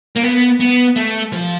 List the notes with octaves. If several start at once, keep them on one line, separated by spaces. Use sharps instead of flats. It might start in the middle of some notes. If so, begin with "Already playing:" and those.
A#3
B3
B3
A3
F3